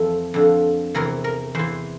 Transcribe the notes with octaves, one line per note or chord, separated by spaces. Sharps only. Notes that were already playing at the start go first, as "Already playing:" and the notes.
Already playing: F2 E3 A4
F2 D3
E2 C3 E3 A#4
A#4
E2 E3 C5